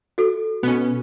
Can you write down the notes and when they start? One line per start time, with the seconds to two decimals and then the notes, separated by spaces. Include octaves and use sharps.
0.18 F#4 A4
0.63 B2 B3 C#4